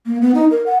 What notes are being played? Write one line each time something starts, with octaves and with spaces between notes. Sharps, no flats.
A#3
B3
D#4
A#4
F#5